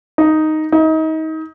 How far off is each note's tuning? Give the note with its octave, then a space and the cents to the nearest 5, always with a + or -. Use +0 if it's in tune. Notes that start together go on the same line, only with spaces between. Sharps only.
D#4 +0
D#4 +30